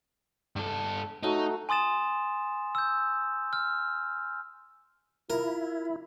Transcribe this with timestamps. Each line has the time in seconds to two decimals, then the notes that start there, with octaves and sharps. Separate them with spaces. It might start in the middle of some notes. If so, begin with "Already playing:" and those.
0.56 G2 A4
1.23 F#3 A3 D#4 F#4
1.69 G#5 C6 D#6 A6 E7
2.75 E6 G6
3.53 F6
5.30 E4 F4 A#4